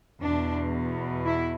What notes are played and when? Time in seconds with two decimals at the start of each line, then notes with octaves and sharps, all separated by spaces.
0.20 E2 B2 D4
1.26 E4